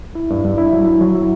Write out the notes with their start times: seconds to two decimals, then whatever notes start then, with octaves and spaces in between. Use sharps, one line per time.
0.15 E4
0.30 G2
0.44 G2
0.58 E4
0.73 F#3
0.86 E4
1.01 F#3
1.15 E4